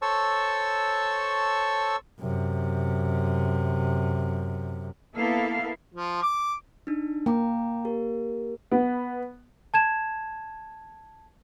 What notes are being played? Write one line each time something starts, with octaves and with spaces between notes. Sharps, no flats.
A4 C5 C#5 A5 C#6 E6
F#2 C3
A#3 B3 E4 A4 F5
F3
D6
D4 D#4
A#3 G5 A#5 D6
G4 A#4
B3
A5 G#6 E7